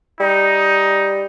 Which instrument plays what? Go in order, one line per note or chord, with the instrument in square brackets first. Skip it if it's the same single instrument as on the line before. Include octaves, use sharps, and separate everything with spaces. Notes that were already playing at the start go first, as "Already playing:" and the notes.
[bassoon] G3 [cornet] D#4